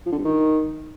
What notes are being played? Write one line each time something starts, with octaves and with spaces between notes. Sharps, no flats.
F3
D3
G2
D#3